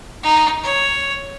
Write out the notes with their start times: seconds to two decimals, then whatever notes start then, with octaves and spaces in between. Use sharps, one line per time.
0.23 D#4
0.63 C#5